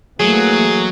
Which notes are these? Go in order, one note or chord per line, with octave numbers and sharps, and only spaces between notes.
E3 F#3 A3 A#3 G#4